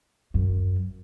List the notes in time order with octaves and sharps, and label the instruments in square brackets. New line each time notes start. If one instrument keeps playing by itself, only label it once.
[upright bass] F#2